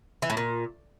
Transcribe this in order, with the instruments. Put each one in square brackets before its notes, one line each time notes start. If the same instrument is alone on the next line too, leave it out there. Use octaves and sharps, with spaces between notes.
[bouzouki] E3
A2
A#2